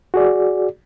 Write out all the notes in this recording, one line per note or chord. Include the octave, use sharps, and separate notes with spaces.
F#4 G#4 D5